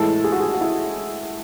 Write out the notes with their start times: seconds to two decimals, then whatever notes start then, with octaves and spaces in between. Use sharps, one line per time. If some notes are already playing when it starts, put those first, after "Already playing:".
Already playing: A2 E3 G#3 A4
0.24 G#4
0.32 F#4
0.40 G#4
0.54 F#4
0.61 E4